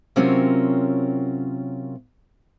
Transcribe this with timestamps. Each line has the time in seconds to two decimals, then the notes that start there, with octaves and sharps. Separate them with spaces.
0.16 C3 F#3 C4 C#4 F4 A#4